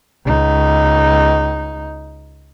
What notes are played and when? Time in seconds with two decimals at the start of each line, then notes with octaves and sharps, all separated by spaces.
0.24 C#2 D#4